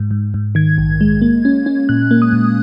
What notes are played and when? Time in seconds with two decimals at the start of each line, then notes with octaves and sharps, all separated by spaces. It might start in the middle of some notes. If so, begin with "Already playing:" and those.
Already playing: G#2
0.11 G#2
0.34 G#2
0.55 D#3 G#6
0.78 A#1
1.01 G#3
1.22 A#3
1.45 C#4
1.66 C#4
1.89 A#2 F#6
2.11 A#3
2.22 D#6
2.33 A#2